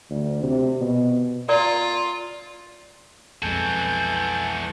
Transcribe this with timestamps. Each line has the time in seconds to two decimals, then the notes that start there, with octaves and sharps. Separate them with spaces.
0.10 D2
0.43 C3
0.81 B2
1.49 F4 A#4 D5 A#5
3.42 B1 F2 E3 G#3 F#4 A4 G#5 G6